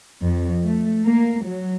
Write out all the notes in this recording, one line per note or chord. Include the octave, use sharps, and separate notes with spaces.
F2
A3
A#3
F#3